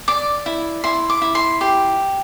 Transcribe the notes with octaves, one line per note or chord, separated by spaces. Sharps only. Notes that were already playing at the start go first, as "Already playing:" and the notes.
D5 D6
E4
E4 C6
D6
E4
C6
G4 C6